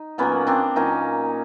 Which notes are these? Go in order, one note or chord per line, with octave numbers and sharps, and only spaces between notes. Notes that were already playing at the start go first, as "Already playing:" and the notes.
Already playing: D#4
A#2 F#3 A#3 B3 C#4
C4 D4
A#2 F#3 A#3 C#4 D#4